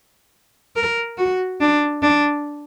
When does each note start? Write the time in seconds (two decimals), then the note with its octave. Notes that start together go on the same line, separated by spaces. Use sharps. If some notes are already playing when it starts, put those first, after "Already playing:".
0.76 A#4
1.18 F#4
1.61 D4
2.02 D4